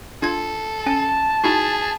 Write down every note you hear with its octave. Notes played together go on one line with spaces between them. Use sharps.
D4 F4 A4 G#6
C#4 G#5 A5
D#4 E4 F#4 G#4